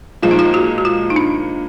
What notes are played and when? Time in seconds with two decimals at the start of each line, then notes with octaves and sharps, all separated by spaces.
0.22 A#2 F3 G#3 F4
0.31 D#4
0.39 F4
0.54 F#4
0.78 F#4
0.85 F4
1.10 D#4
1.16 D4